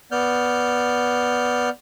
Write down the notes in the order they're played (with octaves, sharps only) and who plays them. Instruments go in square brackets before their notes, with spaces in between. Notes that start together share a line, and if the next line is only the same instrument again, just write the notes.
[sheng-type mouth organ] B3 D5 F6 G6